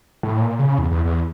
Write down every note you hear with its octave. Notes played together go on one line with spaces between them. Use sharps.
A2
A#2
C#3
E2
E2
E2